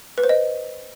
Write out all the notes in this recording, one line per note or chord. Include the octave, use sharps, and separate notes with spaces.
B4
C5
D#5